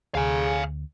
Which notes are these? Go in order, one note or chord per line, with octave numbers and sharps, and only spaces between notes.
D2 G#4 F5 G#5